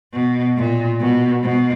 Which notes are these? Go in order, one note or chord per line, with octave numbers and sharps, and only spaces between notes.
B2
A#2
B2
B2